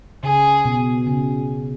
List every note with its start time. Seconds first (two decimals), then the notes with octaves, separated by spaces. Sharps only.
0.23 C#3 G#4
0.65 B2
1.07 C#3